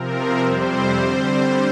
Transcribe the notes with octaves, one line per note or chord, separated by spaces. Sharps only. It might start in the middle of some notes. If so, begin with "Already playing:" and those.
Already playing: C3 F3 C4 A#4
F2 C3 G3 C4 C5
D3 G3 C4 C5